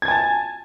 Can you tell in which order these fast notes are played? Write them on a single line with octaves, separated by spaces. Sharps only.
G#6 A6 G#5 A5